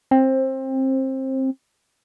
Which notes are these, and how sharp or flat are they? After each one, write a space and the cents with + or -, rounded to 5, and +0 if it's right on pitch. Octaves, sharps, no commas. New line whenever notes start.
C4 +20